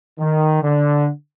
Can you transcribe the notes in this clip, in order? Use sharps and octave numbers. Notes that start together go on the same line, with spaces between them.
D#3
D3